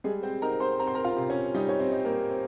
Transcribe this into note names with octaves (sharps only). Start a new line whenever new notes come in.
G3 G#3 G#4
C4 C5
D#4 A#4 A#5
C5 C6
C4 A#5
C6
A#4 A#5
F4 F5
C3
C#4 C#5
G3 D#4 D#5
C#5
C4 C5
D#4
A#3 A#4
C4